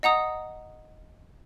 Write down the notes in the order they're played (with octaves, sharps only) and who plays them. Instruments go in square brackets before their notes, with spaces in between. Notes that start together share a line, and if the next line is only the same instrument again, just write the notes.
[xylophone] D#5 F#5 A#5 D#6